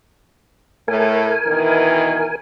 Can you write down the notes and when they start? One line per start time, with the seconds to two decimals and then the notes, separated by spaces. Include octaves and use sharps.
0.88 A2 A3 A#4 G#5
1.46 B2 D#3 E3